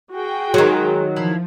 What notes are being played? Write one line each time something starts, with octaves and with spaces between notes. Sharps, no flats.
F#4 G#4 G5
D#3 F#3 G#3 G#5
F3 D4 E4 F5